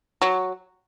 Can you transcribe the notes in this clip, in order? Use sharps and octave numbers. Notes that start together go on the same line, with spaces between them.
F#3